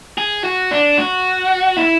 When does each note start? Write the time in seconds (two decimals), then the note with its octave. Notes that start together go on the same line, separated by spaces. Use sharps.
0.18 G#4
0.44 F#4
0.71 D4
0.98 F#4
1.77 E4